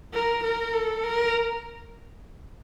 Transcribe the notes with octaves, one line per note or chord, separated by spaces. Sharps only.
A#4
A#4
A4
A#4